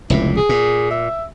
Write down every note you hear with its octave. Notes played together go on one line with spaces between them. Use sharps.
F1 C#2 A#2 E4
G#4
A#2
E5